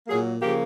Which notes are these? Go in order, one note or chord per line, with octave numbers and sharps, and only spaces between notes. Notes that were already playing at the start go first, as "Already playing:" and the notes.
A#2 F#3 A#3 G#4
C#3 F3 A#3 G4